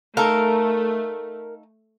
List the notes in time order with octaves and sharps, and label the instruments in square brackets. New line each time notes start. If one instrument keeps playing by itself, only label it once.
[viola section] A3 [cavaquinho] D#4 A4 F5 [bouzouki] A#4